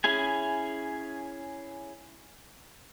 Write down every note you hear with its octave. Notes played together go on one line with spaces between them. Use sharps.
C#4 E4 G#4 G#5